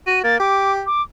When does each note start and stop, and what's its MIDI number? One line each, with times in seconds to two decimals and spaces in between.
0.07 0.22 66
0.07 0.19 99
0.24 0.38 58
0.24 0.39 93
0.40 0.83 67
0.40 0.72 86
0.86 1.02 86